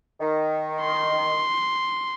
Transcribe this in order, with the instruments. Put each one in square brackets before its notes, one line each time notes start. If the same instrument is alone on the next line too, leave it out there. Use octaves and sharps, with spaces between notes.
[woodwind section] D#3
[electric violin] C6